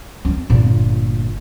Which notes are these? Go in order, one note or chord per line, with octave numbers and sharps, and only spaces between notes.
C#4
G1 A#2